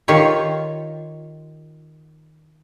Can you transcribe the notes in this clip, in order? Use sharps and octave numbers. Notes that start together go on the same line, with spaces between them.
D#3 F4 G4 C#5